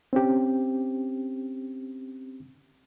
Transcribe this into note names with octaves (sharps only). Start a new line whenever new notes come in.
C4 C#4 G4